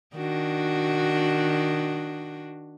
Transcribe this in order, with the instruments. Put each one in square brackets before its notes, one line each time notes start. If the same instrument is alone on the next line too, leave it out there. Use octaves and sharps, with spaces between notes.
[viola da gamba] D#3 D4 F#4